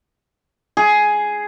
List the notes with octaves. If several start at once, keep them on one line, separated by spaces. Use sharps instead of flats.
G#4